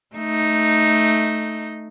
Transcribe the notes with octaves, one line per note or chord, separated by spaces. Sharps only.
A3 D#4